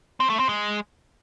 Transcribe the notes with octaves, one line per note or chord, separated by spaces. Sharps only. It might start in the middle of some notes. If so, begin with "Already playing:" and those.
C4
A3
C4
G#3